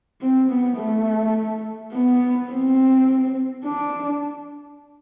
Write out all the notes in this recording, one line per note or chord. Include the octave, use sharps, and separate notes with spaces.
C4
B3
A3
B3
C4
D4